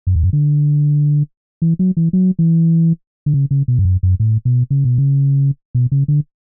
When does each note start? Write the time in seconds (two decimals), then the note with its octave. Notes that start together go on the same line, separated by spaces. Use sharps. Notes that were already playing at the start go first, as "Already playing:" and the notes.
0.07 F#2
0.16 E2
0.23 F#2
0.33 D3
1.62 E3
1.79 F#3
1.97 E3
2.13 F#3
2.39 E3
3.26 D3
3.34 C#3
3.51 C#3
3.68 B2
3.79 G2
3.85 F#2
4.03 F#2
4.20 A2
4.45 B2
4.70 C#3
4.85 B2
4.98 C#3
5.75 B2
5.92 C#3
6.08 D3